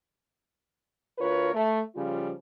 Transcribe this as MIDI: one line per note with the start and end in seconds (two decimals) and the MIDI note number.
1.18 1.51 38
1.18 1.51 65
1.18 1.51 70
1.18 1.51 71
1.18 1.51 73
1.53 1.80 57
1.95 2.31 49
1.95 2.31 53
1.95 2.31 55
1.95 2.31 65